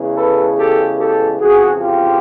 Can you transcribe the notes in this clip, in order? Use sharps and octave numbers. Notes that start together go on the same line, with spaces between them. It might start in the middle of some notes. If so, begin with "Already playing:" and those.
Already playing: E2 C#3 E3 G#3
A4 B4
G4 A4
G4 A4
F2 C#3 E3 F#4 G#4
F4 G4